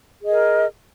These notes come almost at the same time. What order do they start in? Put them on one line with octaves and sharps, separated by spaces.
G#4 D#5 A#4